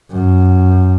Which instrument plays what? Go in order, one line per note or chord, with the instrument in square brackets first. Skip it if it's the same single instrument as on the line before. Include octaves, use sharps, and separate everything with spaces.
[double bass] F#2